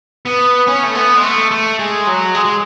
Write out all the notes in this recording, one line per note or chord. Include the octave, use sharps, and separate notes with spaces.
B3
C#4
A3
B3
G#3
A3
A3
G#3
F#3
G#3
G#3